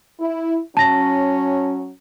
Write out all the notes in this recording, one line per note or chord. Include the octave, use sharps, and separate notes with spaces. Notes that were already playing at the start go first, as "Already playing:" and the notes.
E4
F#3 C#4 A5 A#6